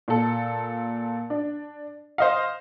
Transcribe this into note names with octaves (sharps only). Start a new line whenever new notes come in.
A#2 A4
D4
C5 D#5 F5